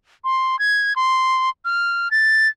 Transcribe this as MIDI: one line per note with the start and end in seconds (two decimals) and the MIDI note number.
0.24 0.59 84
0.59 0.93 92
0.96 1.49 84
1.65 2.11 89
2.11 2.48 93